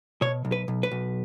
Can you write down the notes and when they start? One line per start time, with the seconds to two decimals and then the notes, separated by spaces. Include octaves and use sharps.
0.22 B2 C#5
0.45 B1
0.52 B4
0.68 B1
0.83 B4
0.91 B1